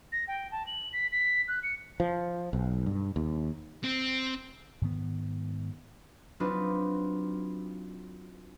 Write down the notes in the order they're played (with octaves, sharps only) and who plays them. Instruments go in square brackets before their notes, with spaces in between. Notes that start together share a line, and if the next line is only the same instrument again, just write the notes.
[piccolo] A#6
G5
A5
F#7
B6
B6
F#6
C#7
[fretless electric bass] F3
B1
G2
D#2
[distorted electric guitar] C4
[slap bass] G#2 D#3 B3
[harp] F#3 C4 D4 D#4 F4 B4